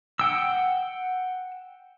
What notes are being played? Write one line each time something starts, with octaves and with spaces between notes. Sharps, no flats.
F#5 G5 E6